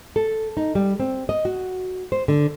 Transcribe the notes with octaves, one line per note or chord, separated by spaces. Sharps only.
A4
D#4
G3
C4
D#5
F#4
C5
D3